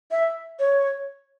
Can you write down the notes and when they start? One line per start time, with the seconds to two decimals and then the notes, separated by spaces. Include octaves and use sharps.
0.11 E5
0.59 C#5